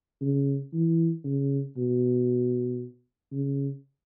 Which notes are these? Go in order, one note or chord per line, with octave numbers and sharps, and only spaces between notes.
C#3
E3
C#3
B2
C#3